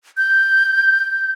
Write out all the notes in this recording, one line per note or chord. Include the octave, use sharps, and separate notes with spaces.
G6